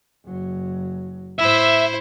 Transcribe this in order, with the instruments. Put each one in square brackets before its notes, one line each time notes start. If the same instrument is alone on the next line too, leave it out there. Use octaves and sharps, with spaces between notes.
[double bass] F#1 F#3
[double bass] A2 [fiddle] E4 C5 [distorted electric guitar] E5